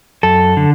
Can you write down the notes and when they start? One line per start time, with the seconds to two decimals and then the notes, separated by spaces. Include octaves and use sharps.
0.23 F#2 A4
0.57 D3